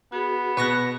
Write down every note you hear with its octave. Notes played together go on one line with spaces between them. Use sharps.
B3 F#4 G#4
B2 B4 C#6 F#6 A#6